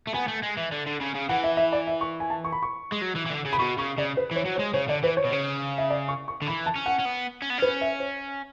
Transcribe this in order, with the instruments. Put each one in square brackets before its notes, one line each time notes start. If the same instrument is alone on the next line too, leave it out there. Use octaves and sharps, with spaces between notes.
[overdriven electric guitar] A3
[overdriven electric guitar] B3 [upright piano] G#5
[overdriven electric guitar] A3
G#3
E3
D3
D3
C#3
C#3
[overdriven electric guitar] E3 [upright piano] F#5
[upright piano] E5
E5
D5
E5
C#6
G#5
A5
C#6
B5
C#6
[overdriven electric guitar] G#3
F#3
E3
E3
D3
C#3
[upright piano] B5
[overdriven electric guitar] B2 [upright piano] C#6
[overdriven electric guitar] C#3 [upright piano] C#6
[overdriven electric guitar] C#3 [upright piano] D5
[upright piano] B4
[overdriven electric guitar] E3 [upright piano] C#5
[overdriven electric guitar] F#3
[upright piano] C#5
[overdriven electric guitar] G#3
[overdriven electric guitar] C#3 [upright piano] C#5
[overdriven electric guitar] D3 [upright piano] D5
[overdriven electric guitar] E3 [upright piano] B4
[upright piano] C#5
[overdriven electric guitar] B2
C#3
[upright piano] E5
D5
C#6
C#6
[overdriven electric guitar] D3
[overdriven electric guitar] E3 [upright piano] B5
[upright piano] A5
[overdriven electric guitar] C#4
[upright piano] F#5
[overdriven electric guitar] C#4
B3
C#4
B3
[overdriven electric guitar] C#4 [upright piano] B4
[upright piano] E5
C#5